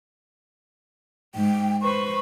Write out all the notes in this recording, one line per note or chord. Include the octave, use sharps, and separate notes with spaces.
G#2 G5
B4 C5 C#6